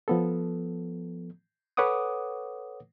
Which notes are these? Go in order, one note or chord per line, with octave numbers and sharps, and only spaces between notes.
F3 B3 A4
A4 B4 C#5 F#5 D6 D#6